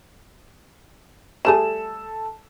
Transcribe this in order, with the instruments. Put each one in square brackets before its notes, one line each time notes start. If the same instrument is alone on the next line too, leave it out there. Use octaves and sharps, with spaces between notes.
[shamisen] G3 A3 G#4 [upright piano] A4 E7